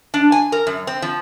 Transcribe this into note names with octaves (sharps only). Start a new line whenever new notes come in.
D4
G#5
A#4
F#2
C4
F3